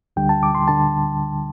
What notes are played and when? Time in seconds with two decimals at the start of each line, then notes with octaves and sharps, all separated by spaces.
0.16 D2 D3 G3 G5
0.29 A5
0.43 D6
0.55 C6
0.68 D3 A5